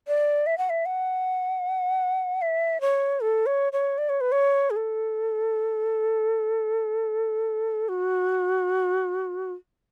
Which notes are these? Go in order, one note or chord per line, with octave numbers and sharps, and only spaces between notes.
D5
E5
F#5
E5
F#5
E5
C#5
A4
C#5
C#5
D5
C#5
B4
C#5
G#4
A4
F#4